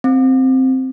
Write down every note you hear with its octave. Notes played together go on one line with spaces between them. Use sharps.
C4